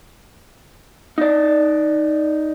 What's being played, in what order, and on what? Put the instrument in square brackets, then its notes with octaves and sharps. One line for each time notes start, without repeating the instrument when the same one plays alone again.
[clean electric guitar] D#4 D5